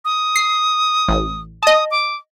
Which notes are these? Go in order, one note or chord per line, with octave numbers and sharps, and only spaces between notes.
D#6
C7
A1
D#5 A5 D#6
D6